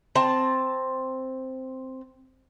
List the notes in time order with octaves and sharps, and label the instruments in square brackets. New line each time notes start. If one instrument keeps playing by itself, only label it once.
[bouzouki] C4 A5